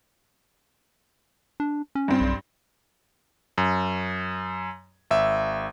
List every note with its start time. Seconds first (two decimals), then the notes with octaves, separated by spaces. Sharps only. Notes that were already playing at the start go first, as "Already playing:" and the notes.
1.60 D4
1.95 C#4
2.08 G2 C4
2.21 B1
3.58 F#2
5.11 G#1 E5